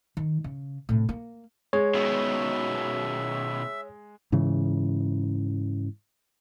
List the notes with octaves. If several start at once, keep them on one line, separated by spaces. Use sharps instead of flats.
D#3
C#3
A2 C3
A#3
G#3 C#5
B2 D#3 E5
G#2 C#3 E3